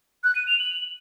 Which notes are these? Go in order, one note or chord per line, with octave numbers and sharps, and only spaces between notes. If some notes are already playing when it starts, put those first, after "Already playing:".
F#6
D#7
F7
F#7